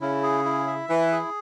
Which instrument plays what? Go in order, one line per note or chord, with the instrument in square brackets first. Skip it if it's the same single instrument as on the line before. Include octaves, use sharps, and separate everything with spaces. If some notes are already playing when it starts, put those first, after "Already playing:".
[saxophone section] C#3 [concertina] E4
[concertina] G#4
E4
E5
[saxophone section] E3 [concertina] E4
[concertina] G#4